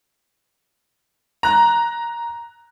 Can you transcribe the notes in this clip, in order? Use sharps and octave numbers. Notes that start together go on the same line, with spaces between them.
A#5 F#6